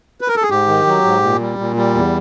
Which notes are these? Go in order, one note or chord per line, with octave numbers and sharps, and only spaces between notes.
B4
A#4
A4
G#4
G#2 G4
D#3
F#3
G#2
A#2
G3
A#2
G3
E2